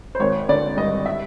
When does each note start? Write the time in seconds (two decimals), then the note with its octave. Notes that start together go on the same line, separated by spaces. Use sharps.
0.15 C5
0.20 G#1 C#5
0.49 D3 D5
0.77 G2 D#5
1.06 E5